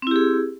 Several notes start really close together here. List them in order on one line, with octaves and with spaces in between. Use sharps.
C4 E4 G4 G#4